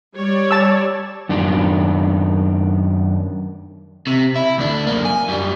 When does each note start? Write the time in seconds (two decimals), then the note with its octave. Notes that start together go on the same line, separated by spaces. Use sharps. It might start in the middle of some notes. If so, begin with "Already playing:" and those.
0.16 G3 C#5 D5
0.51 A5 E6
1.29 F#2 D#3 D4
4.07 C3
4.36 E4
4.58 D2 D4
4.87 F#2 A#3
5.05 G#5
5.28 F#2 G3